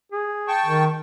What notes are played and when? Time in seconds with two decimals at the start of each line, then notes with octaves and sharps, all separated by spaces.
0.12 G#4
0.48 G5 A5 C#6
0.66 D#3